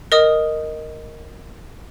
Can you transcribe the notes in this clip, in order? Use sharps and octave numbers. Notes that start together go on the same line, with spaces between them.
A#4 D#5 D#6